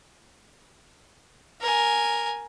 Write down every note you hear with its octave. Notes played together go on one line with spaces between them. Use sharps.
A#4 G#5